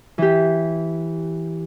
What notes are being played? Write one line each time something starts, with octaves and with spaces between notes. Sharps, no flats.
E3 G4